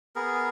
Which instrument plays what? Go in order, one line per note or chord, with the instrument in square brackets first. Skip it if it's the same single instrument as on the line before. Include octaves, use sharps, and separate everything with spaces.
[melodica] B3 G#4 A#4